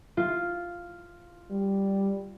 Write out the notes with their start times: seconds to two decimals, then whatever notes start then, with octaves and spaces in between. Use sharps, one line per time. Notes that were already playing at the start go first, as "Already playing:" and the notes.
0.17 F4
1.50 G3